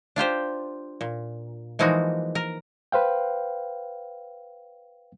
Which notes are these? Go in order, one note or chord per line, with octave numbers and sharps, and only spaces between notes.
D4 F4 G4 C5
A#2
E3 F3 G#3 A#3 D#4 F#4
A#4
B4 C5 F5 G5